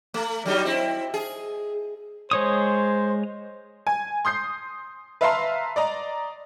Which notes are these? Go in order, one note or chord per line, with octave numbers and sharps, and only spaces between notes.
A3
F#3 G3 D#4
C4 E4
G#4
G#3 C5 C#5 D#6
G#5
C6 D#6 G6 C7
B4 E5 F5 A5 A#5 C6
D5 D#5 A#5